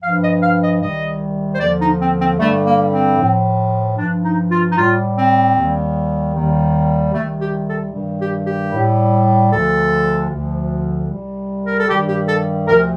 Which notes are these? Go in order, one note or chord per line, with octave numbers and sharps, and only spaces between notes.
G2 F3 F5
D#5
F5
D#5
C2 C3 D#3 G3 D#5
C5
D#2 D3 F3 D5
D#4
C4
C4
G2 D3 G3 A3
A#3
C4
A2 F3
G2 F3 D4
D#4
F4
D#4
A2 G3 F4
C4
D#2 D#3 G3
D#2 D#3 G3
C2 C3 D#3 G3 A3
G4
A4
G2 D#3 G3
G4
G4
A2 G3
D2 D3 F3 A4
D2 D3 F3
C2 C3 G3
A#4
A4
G2 D#3 G3 G4
G4
A4
D2 C3 F3 A#4